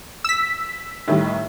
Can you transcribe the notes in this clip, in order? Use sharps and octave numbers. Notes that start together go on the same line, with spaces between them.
E6 B6
A2 D#3 G3